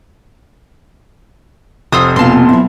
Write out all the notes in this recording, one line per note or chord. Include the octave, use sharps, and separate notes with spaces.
F1 F4 C5 D#6 E6
B2 A#3 C4 F4 G#5 A5 C6
F3 F#3 E4